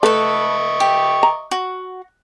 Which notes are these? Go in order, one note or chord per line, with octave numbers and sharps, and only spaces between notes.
A3 A4 B4 D#5 E5 C#6
G4
A#5
F#4